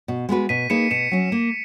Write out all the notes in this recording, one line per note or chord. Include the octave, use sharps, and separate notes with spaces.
B2
G#3 B3 F#4 B4
B2 B6 D#7
A#3 D#4 G#4 B4 C#7 E7
B2 C#7 E7
F#3 C#4
A#3